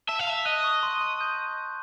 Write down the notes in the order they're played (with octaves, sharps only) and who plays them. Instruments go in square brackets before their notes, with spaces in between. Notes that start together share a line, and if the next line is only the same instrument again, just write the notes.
[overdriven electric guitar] E5 [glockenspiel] A5
[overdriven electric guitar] F5
[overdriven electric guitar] E5 [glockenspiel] A5
[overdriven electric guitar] D#5 [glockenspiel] F#6
[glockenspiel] C#6
C6
C6
G6